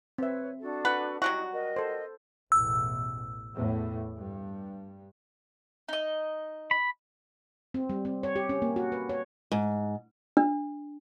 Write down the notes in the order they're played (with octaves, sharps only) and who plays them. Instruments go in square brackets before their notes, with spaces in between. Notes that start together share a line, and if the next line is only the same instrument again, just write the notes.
[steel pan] C4 E5 [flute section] B4 C#5
[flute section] D4 F#4 A4
[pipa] B4 [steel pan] F#5
[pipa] F#3 G3 F#4 [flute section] D#4 E4 [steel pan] F#5
[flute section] A#4 D#5
[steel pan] A4 C5
[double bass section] A1 E2 B2 [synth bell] E6
[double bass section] E2 A2
G2
[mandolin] D#4 D#5
[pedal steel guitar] B5
[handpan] C4
G3
C4
C#5
G4
C#4
A#3
F#4
B4
C#5
[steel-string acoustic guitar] G#2
[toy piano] D4